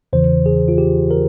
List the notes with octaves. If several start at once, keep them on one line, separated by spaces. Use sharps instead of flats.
E2 C#3 E3 C5
G#4
F4
G4
A#4